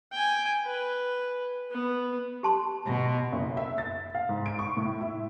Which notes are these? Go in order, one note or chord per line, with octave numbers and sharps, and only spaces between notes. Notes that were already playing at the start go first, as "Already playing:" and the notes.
G5 G#5
B4
B3
G4 A5 C6
B2
F#1
E5
A6
F5
G#2
D7
C#6
A2
E4